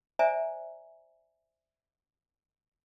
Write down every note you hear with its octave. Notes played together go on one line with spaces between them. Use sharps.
C5 D5 E5 G#5 A#5